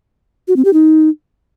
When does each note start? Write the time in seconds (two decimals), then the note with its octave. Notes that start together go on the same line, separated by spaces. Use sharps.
0.48 F#4
0.56 C4
0.65 G4
0.73 D#4